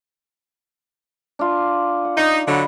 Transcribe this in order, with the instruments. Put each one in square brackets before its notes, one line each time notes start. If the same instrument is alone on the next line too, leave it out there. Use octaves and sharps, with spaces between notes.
[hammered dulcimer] D4 F4
F#5
[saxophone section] D#4
[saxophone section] D3 F#3 [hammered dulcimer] D#5 B5